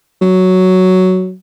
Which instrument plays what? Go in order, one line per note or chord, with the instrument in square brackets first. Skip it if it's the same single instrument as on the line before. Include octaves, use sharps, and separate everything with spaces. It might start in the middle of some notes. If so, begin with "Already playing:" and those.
[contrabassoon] F#3